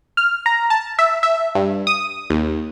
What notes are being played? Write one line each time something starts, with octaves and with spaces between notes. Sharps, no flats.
F6
A#5
A5
E5
E5
G2
D#6
D#2